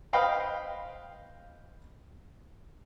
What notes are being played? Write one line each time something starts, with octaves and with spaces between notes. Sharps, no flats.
B4 C5 D#5 F5 G5 B5